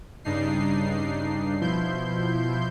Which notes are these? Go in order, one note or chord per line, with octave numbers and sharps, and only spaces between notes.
G2 C#3 D4 D#4 C7
B2 F3 E4 C6 G6